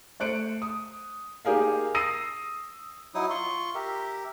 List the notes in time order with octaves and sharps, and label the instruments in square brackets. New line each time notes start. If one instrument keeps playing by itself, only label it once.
[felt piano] A3 C5 F#6 C#7 D7
D#6
A#3 D#4 G4 G#4 A#4 F5
D#6 E6 A#6 C7 D#7
[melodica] F#3 D#4 E4 D#6
F4 C6 C#6
G4 A#4 E5